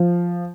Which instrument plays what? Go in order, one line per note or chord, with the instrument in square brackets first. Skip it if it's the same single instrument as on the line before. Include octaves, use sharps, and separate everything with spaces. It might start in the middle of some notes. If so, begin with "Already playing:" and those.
Already playing: [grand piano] F3